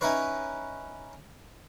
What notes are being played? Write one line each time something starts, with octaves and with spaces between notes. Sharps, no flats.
C#4 D#4 E4 B4 C#5